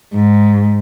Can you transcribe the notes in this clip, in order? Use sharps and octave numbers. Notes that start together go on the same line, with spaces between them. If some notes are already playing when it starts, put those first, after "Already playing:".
G#2